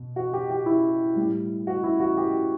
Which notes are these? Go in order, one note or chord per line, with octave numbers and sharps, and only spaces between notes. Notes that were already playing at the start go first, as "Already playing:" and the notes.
Already playing: B2
F#4
G4
G4
E4
A2 G3
F#4
E4
F#4
G4